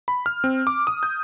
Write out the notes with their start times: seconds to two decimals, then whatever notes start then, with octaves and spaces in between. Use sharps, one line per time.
0.08 B5
0.26 F6
0.44 C4
0.67 D6
0.87 D#6
1.03 G6